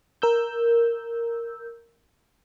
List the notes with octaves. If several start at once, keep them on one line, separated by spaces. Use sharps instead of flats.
A#4 E6 G6